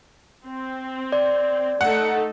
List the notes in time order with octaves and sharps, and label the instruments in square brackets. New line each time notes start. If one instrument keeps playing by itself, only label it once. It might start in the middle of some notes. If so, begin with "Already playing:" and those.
[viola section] C4
[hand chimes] D5
[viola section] A3 D#4 A4 [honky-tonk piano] F#5